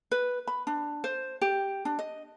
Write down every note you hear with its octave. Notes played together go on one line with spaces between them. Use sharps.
B4
B5
D4
C5
G4
D4
D#5